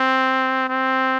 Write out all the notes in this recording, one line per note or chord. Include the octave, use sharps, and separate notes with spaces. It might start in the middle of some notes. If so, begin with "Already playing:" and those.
Already playing: C4
C4